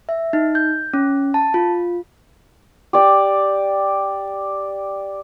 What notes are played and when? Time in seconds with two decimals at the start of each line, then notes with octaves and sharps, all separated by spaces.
0.09 E5
0.33 D#4
0.55 G6
0.94 C#4
1.34 A5
1.54 F4
2.93 G4 D5